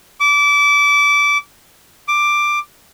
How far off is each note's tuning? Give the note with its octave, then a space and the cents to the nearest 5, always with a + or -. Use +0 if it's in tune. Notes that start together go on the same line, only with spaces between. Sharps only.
D6 -25
D6 +10